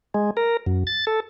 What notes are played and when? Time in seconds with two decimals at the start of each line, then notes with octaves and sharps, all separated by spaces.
0.14 G#3
0.37 A#4
0.66 F#2
0.87 A6
1.07 A4